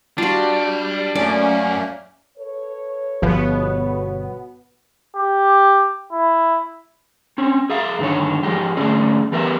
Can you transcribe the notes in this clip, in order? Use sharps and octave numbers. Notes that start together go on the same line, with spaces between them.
G3 D4 F4 F#4
F#2 A3 A#3 C#4 D5
A4 B4 C#5
G1 B2 F3 B3
G4
E4
C4 C#4
G#4 E5 F5
G2 D3 D#3 C#5
G#2 F3 G#3 G4
G#2 D3 A3 C#4 G#4 D5
E3 B3 G4 A#4 B4 E5